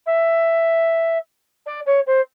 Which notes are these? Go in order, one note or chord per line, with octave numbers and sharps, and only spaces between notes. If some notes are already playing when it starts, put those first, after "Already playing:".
E5
D5
C#5
C5